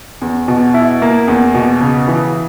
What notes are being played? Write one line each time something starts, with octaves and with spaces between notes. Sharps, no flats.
E2
B2
E4
A#3
E2
B2
C#3
E3